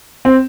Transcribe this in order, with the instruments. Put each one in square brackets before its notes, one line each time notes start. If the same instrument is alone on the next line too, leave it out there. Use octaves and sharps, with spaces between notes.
[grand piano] C4